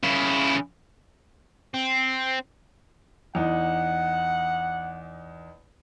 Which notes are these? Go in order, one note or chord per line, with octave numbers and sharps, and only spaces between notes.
C#3 E4
C4
E2 D#4 F#5